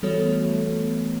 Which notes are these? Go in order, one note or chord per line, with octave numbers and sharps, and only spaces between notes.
E3 G3 B3 F#4 A4 C#5
A3
A3
B3